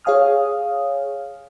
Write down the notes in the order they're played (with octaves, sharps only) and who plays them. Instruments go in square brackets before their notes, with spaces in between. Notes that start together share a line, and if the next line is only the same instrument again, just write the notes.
[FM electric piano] G#4 C#5 F5 G#5 D#6 F6